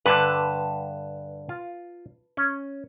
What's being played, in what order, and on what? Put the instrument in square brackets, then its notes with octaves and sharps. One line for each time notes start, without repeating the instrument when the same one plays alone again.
[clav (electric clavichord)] G2 D3 [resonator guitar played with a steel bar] B4 A5
[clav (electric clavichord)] F4
C#4